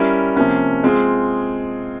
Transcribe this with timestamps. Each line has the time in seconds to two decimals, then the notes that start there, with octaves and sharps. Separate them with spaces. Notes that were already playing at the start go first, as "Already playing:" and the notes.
Already playing: G3 C#4 E4 A#4
0.37 C3 F3 A#3 C#4
0.84 G#3 C4 F4 G#4